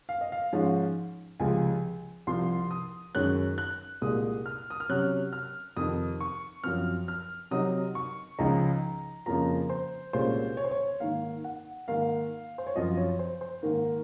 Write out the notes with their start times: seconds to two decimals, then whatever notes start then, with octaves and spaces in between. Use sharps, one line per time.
0.09 F5
0.21 D#5
0.32 F5
0.53 G#2 F3 G#3 C#4
1.40 C#2 C3 F3 G#3 G#5
2.27 C2 C3 F3 C6
2.71 D#6
3.15 F#2 D#3 G#3 C#4 F#6
3.58 F#6
4.02 C2 A#2 G#3 D#6
4.46 F6
4.70 D#6
4.80 F6
4.89 C3 F#3 C#4 F#6
5.33 F6
5.77 F2 C3 D#3 D#6
6.21 C#6
6.64 F#2 F3 C4 F6
7.08 F6
7.51 C3 F#3 C4 D#4 D#6
7.95 C#6
8.39 C#2 C#3 F3 G#3 D#4 A#5
9.26 F2 C#3 F3 A#3 F4 A#5
9.70 C5
10.13 C2 A#2 G#3 C#4 F4 C5
10.57 C#5
10.64 C5
10.71 C#5
11.00 G#2 D#3 A#3 F5
11.44 F#5
11.88 G#2 D#3 A#3 F5
12.58 C5
12.67 C#5
12.75 F#2 F3 C4 F4 D#5
12.97 C#5
13.19 C5
13.41 C5
13.63 G#2 D#3 A#3 A#4